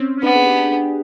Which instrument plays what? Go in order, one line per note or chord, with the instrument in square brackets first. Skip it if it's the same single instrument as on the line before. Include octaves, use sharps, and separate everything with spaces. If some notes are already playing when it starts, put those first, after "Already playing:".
Already playing: [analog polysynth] C4 C#4
C#4
[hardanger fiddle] B3 [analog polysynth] D4
[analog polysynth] G#4
G4